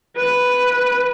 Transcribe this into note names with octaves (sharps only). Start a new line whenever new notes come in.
B4